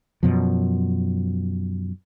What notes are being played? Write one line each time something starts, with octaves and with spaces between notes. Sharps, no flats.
F#2 B2 F3